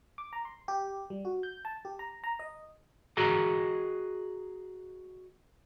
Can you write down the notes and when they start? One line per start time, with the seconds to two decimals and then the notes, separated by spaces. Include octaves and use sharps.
0.18 D6
0.33 A#5
0.45 C6
0.68 G4
1.10 G3
1.25 F#4
1.43 G6
1.65 A5
1.85 G4
1.99 A#5
2.24 A#5
2.39 D#5
3.17 F#4 G#4 D#5 A#5